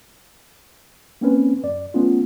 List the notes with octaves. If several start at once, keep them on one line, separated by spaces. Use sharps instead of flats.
A#3 C4 C#4 B4
F#2 D5
A3 B3 C#4 F4